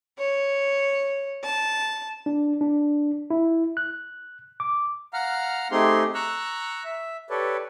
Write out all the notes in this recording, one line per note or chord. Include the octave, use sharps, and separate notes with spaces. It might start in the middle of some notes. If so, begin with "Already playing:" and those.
C#5
A5
D4
D4
E4
F#6
D6
F5 F#5 A#5 F6
A3 C4 D#4 G4 G#4 C6
A#5 C#6 E6 F#6
E5
G4 A4 B4 C#5 D5